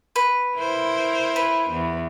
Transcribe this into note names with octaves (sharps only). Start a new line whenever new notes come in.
B4
E4 A#4 C5
B4
E2